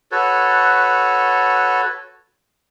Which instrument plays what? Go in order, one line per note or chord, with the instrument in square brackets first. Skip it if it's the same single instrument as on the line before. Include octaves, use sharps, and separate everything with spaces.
[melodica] F#4 A4 B4 C#5